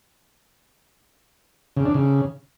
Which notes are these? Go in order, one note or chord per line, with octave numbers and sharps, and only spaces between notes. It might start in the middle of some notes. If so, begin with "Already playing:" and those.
C#3
D4
C#3